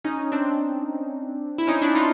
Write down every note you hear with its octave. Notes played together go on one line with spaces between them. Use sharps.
C#4 D#4
C4 D4
E4
C#4 D#4
D4 E4
D#4 F4